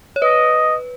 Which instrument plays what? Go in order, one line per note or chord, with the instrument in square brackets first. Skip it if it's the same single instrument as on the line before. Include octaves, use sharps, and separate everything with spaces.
[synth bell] C#5
[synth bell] B4 [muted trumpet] D#5